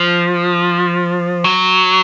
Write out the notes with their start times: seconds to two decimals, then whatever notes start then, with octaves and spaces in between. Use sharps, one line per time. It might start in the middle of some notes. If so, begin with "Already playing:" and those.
Already playing: F3
1.44 F#3